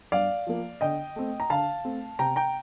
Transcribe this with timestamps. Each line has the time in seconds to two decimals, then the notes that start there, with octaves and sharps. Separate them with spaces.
0.12 G2 D5 F5
0.47 F3 A#3
0.81 D3 D#5 G5
1.16 A3 C4
1.40 A#5
1.50 D3 F5 A5
1.84 A3 C4
2.19 C3 G5 A#5
2.36 G5 A#5